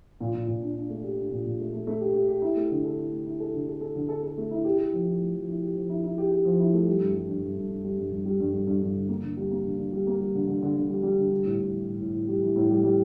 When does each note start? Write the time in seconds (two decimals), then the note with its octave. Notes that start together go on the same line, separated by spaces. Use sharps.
0.20 A#2
0.34 A#2
0.48 A#2
0.62 D4
0.76 D4
0.89 A3
1.03 G4
1.18 D4
1.31 A#2
1.46 A#2
1.60 A3
1.73 A3
1.87 A3
2.01 G4
2.14 G4
2.29 G4
2.42 E4
2.56 A3
2.71 D3
2.84 A4
2.98 E4
3.12 A3
3.26 E4
3.40 A4
3.53 D3
3.68 A4
3.81 A4
3.95 D3
4.09 A4
4.23 A4
4.38 A3
4.51 E4
4.65 G4
4.78 G4
4.92 F3
5.06 E4
5.20 A3
5.34 F3
5.48 E4
5.62 G4
5.75 F3
5.90 E4
6.04 E4
6.18 G4
6.31 G4
6.45 F3
6.60 E4
6.74 A3
6.87 G3
7.00 G2
7.14 G3
7.29 G2
7.43 G2
7.57 G2
7.71 G2
7.84 G3
7.99 G2
8.11 G2
8.25 G3
8.40 G2
8.53 G2
8.67 G2
8.82 G2
8.96 D3
9.09 A#3
9.23 D3
9.37 G3
9.51 A#3
9.64 D3
9.78 D3
9.92 G3
10.07 A#3
10.20 G3
10.35 D3
10.47 D3
10.62 D3
10.76 D3
10.89 G3
11.03 G3
11.17 D3
11.31 G3
11.45 A2
11.59 A2
11.73 E3
11.87 A2
12.00 A2
12.14 A2
12.28 G3
12.42 E3
12.56 A2
12.70 G3
12.83 G3